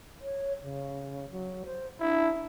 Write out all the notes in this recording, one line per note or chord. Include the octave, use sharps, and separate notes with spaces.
C#5
C#3
F#3
C5
D4 E4